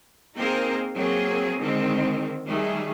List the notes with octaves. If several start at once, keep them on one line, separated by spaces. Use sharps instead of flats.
A#3 C4 D#4 G#4 A#4 C5
F#3 A#3 C4 G#4
D3 D#3 G#3 C4
D#3 G3 A3 G#4